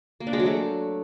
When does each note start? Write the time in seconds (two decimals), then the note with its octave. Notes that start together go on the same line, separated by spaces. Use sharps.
0.20 A#3
0.27 D4
0.33 G#3
0.39 F#3
0.46 A3